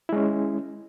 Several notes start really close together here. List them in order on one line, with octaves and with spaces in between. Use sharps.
E4 G#3 C#4